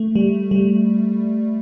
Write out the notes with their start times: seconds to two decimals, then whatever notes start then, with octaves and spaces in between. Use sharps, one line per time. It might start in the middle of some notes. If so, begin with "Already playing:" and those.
Already playing: A3
0.15 G3
0.51 G3